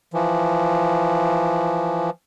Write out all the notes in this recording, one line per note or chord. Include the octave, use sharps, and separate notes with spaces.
E3 F3